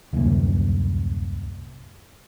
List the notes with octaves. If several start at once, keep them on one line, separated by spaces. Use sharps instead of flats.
D1 C2 F#2 A#3